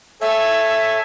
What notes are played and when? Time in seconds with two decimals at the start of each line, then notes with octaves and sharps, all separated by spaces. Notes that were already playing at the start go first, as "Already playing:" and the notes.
0.21 A4 C#5 E5 G#5